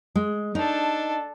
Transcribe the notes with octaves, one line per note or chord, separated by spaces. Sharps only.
G#3
D4 D#4 A4